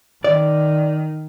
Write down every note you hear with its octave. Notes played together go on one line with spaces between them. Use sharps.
D#3 D5